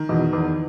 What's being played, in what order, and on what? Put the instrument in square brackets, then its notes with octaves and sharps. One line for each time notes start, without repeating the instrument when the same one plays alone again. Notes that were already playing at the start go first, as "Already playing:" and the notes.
Already playing: [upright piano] D#3
[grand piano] E2 B2
E2